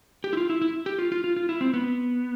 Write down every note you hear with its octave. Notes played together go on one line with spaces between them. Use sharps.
G4
E4
F4
E4
E4
G4
F4
F4
F4
F4
E4
C4
B3